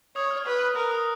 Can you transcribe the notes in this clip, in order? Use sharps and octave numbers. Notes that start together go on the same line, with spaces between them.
C#5 D#6
F6
B4 F6
F6
A#4 F#6
D#6